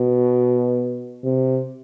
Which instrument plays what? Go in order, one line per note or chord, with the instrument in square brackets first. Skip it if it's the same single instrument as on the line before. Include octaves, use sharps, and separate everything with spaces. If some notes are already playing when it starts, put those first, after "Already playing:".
Already playing: [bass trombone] B2
C3